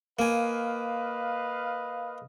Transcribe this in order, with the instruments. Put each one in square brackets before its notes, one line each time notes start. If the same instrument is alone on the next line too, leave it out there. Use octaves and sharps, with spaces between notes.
[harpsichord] A#3 G#5 [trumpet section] B4 D#5 F5